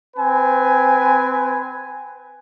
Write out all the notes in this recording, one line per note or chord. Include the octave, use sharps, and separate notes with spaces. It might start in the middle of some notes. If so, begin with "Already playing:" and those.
C4 B4 G#5